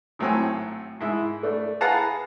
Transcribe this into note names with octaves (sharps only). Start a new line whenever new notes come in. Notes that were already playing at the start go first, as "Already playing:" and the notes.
G#1 A2 F#3 C4 G#5
G#2 E4
A3 D4
G#4 B4 F5 F#5 A5 A#5